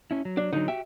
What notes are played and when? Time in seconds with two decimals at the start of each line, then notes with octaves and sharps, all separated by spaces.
0.11 C#4 E4
0.25 F#3
0.37 D4
0.53 D3 F#3 D#4
0.68 F#4 G4 E5 G5